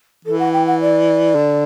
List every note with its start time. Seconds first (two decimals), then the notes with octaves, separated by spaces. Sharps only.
0.25 E3 A4
0.39 F#5
0.53 G5
0.66 F#5
0.80 D5
1.35 D3